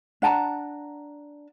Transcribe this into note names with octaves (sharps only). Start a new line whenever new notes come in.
D4 F#5 A5 A#5